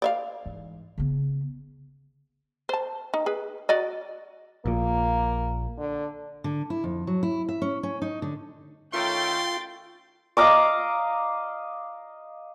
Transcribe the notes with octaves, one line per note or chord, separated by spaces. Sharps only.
D5 E5 F5
G#2 E3
C#3 B3
C5 A5
D#4
G#4 B4
F#4 D5 D#5
A#1 A#2 A#3
D3
D3
E4
F2
F#3
E4
E5
C#4
C#4
D#4
D3
D#3 A3 C#4 F4 G5 C6 G6 A6
D#5 F5 A#5 D6